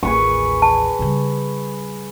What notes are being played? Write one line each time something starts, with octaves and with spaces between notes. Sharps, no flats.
A1 D#2 G#4 B4 C#6
A5
C#3 G3